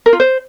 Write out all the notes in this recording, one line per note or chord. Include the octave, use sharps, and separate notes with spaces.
A#4
F4
C5